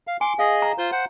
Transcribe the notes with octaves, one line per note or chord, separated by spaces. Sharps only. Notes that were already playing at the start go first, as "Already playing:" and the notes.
F5
G#5 C6 D6
G#4 D#5 F5
A#5
F4 C5 G6
C5 F#5